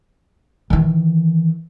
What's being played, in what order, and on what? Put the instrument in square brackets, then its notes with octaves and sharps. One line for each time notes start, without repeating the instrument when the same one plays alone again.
[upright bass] D#3 E3